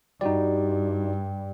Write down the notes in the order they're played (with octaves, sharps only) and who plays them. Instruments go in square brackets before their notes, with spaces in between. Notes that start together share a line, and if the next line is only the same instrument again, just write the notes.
[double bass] G2 [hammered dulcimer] G3 [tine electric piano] D#4 F#4 D5